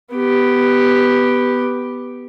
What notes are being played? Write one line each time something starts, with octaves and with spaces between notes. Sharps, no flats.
B3 G4